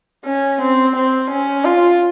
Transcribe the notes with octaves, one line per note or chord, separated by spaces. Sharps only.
C#4
C4
C4
C#4
F4